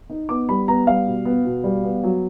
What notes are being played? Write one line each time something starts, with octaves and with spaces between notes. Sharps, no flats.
D#4
B3 D6
G3 B5
B3 A#5
G3 F5
B2
B3
B2
G3
B3
F#3